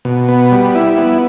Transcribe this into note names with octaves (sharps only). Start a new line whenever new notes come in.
B2
B3
G3
E4
B3